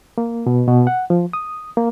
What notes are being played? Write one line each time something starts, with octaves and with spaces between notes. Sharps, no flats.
A#3
B2
B2
F#5
F3
D#6
A#3